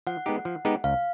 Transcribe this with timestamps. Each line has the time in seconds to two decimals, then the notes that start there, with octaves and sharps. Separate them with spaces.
0.07 F3 F#5
0.26 G#3 B3 D#4 G4
0.45 F3
0.65 G#3 B3 D#4 G4
0.84 C#2 F5